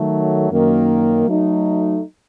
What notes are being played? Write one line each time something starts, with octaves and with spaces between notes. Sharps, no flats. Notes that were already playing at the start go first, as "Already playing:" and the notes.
Already playing: D#3 F#3 A3
F#2 D#3 A#3
F#3 A3 D#4